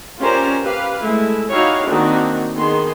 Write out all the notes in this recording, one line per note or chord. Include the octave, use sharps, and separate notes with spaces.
C#4 F4 G4 A#4 C5 D5
G4 B4 F5
G#3 A3 E4
D#4 E4 F#4 G4 C#5 F5
D#3 A#3 C4 D4 D#4 F#4
D#3 B3 G#4 C6